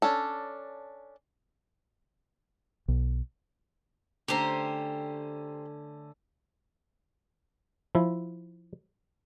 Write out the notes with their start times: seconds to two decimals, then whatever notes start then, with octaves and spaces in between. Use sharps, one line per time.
0.02 C#4 D4 A4
2.88 B1
4.28 D3 A3 C#4 G4 C5 A#5
7.95 F3 E4